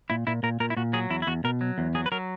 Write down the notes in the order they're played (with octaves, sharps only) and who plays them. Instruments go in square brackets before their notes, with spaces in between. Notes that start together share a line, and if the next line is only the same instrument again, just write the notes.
[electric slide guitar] A#2 E4
A#2 E4
A#2 A#4
A#2 A#4
E4
A#2 F#4
F#3 G#4
E2 E4
E4
E2 F#4
B2 A#4
F#3
E2
F#3 G#4
B4
F#3 A#4